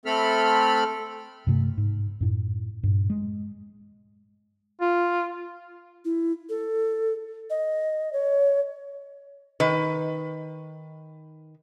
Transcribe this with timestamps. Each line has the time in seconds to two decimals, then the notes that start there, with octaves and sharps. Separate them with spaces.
0.06 A3 C4 A4 B5 F6
1.47 G2 C3 A3
1.77 G#2
2.21 F#2 A2
2.83 G2 A#2
3.10 G#3
4.81 F4
6.05 E4
6.49 A4
7.50 D#5
8.13 C#5
9.60 D#3 B4